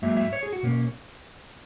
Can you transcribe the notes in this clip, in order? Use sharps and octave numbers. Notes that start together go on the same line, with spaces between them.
G#2 F#3 A#3 E5
E5
C#5
G#4
F#4
B2 A#3 C#4